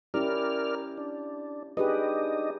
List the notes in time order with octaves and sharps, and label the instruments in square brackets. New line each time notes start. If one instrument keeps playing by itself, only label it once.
[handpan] C#4 E4 G4 [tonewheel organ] A#4 D5 F6
[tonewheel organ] D4
[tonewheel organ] D4 D#4 D#5 [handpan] G4 G#4 B4